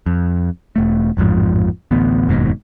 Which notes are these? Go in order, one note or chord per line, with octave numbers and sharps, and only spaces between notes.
F2
E1 A3
A1 F2 G#2 F3
A1 D2 B3
F1 D#2 G#2 B2